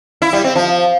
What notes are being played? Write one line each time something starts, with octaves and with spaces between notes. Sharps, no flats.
E4
G3
C4
F3